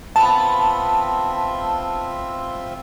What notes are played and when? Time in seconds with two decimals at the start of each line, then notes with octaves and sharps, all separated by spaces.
0.16 B3 C4 F4 E5 A5